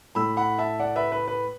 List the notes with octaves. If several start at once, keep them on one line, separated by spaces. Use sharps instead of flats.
A2 A3 B5 E6
F#5 B5
E5 A5
D5 F#5
B4 E5
B4
B4